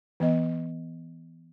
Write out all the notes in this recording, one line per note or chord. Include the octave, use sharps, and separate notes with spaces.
E3 B3 D#5